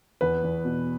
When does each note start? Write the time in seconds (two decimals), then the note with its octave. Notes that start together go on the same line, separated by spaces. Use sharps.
0.21 E2 B4
0.43 E2
0.65 B2